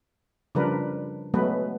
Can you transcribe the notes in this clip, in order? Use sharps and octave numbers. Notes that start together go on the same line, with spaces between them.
C#3 F3 G3 D4 A#4 B4
F#3 G#3 A3 B3 B4